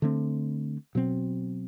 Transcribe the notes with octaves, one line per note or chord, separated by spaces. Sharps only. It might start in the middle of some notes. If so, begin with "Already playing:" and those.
D3 A3 C4
B2 F#3 C4